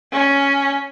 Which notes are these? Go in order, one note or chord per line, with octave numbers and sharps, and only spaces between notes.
C#4